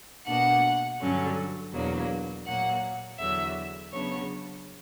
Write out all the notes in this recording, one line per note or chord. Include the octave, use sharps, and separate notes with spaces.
B2 A#3 D4 F#5
G2 D3 F#3 C#4
E2 B2 F#3 A#3 D4
A#2 F#3 A#3 F#5
E2 D3 F#3 E5
C#3 F#3 B3 D4 C#5